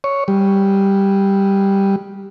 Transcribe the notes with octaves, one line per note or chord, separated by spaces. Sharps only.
C#5
G3